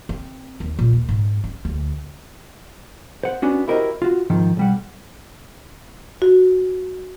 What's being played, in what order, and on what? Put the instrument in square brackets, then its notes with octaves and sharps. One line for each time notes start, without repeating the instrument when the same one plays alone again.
[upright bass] C4
D#2
A#2
D#2
G#2
C#4
D2
[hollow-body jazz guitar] C5 F#5
B3 C#4 D4 F#4
E4 F#4 G4 A#4 C5 D#5
F4 F#4
G#2 D#3 F3
B1 G3 F#5
[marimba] F#4